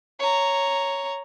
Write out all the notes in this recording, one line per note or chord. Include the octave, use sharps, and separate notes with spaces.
C#5 A#5